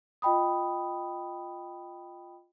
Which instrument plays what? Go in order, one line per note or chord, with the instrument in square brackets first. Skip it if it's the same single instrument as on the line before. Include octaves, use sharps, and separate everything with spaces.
[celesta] F4 D#5 G5 B5 D#6